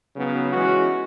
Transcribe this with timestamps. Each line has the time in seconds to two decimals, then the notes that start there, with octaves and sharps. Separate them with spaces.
0.15 C#3 F#3 B3 D#4
0.51 E3 G#3 C#4 F#4